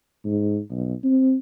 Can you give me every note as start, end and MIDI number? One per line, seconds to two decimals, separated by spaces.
0.25 0.59 44
0.70 0.94 35
1.04 1.35 60